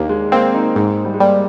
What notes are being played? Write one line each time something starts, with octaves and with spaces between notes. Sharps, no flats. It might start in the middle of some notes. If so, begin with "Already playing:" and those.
Already playing: D#2 A#3 D4
G#3
A#3 C4
D#4
G#2 D#4
G3
G#3
G3 A#3